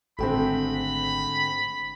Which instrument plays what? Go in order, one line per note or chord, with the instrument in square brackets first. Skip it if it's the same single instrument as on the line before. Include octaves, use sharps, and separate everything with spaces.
[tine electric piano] G#1 G5 [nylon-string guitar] G#2 D3 [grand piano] A3 C4 [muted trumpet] B5